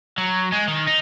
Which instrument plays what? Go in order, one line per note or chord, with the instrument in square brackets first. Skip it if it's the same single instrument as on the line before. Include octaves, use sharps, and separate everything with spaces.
[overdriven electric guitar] F#3
G#3
D#3
D#4